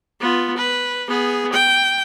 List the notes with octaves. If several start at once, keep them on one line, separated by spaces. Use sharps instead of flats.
B3 F4
B4
B3 G#4
G5